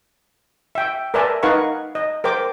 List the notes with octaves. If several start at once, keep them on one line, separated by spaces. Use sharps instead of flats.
E5 G5
A#4 B4 D5 E5 G#5 A5
D#4 A#4 B4 F5 F#5 C#6
D#5
A#4 C5 G5 D6